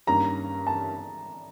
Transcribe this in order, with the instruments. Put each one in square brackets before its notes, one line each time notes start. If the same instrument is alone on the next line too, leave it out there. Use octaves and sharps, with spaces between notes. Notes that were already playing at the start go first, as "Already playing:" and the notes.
[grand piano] G2 D#3 G3 A#3 C#4 [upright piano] A#5
[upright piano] A5